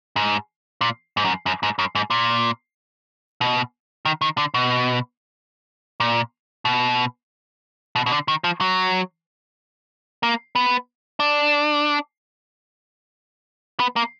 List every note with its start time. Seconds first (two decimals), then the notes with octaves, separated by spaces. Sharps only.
0.16 G#2
0.81 A#2
1.17 G#2
1.24 F#2
1.46 F#2
1.63 G#2
1.79 F#2
1.95 G#2
2.10 A#2
3.41 B2
4.05 D#3
4.21 D#3
4.38 D3
4.54 B2
6.00 A#2
6.65 B2
7.95 B2
8.06 B2
8.12 D3
8.28 D#3
8.44 F3
8.61 F#3
10.23 A#3
10.55 B3
11.20 D4
13.80 B3
13.96 A#3